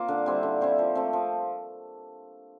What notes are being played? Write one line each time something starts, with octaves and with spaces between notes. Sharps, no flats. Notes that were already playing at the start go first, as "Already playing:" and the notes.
Already playing: A#3 C4 F4
D3
G3 C4 E4
D3
G3 C4 E4
F3
A3 C4
F3